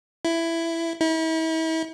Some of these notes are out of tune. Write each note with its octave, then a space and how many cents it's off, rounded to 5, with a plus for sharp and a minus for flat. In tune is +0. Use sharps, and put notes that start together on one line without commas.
E4 +10
E4 -40